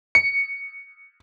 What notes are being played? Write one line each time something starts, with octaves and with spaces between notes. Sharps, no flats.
C#7